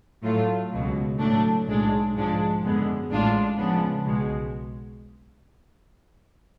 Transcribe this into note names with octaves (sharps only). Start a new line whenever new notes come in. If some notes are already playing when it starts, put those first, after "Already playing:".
A2 F#3 A3 F4
C#2 B2 F#3
A2 F#3 A3 D4
B1 A2 G#3 D4
G#2 F3 G#3 D4
F#2 D3 G#3 B3
A1 A2 G#3 D4 F4
C#2 C#3 F3 B3 D4
B1 B2 G#3